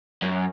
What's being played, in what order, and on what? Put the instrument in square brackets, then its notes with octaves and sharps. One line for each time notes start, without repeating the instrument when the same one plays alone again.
[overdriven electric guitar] F#2